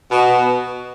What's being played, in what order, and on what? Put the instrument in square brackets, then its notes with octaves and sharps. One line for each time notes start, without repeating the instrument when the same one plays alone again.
[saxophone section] B2